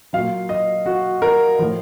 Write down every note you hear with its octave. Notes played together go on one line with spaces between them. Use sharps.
A#2 F#3 F5
D#5
F#4
A#4
A2 F3